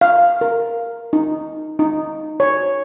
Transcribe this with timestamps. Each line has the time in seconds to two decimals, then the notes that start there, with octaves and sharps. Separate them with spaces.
0.01 F5
0.41 A#4
1.13 D#4
1.79 D#4
2.40 C#5